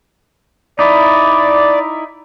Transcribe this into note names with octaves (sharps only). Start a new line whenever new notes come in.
D#4 E4 D5